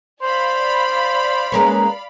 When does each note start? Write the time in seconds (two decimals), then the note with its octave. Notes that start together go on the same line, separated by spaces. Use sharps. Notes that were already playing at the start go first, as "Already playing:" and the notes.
0.22 C5 D5 F5 B5
1.52 G#3 A#3 C#4 B4 A#5